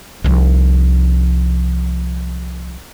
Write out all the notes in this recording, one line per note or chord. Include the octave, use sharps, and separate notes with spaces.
C2 F3